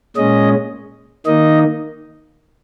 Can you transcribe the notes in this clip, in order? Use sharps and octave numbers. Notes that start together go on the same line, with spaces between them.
A#2 G#3 C#4 D#5
D#3 A#3 D#4 D#5